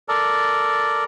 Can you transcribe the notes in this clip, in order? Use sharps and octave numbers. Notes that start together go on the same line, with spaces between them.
A4 A#4 D5